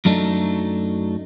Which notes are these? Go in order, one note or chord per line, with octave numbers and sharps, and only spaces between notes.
F#2 F#3 A3 D4 D#4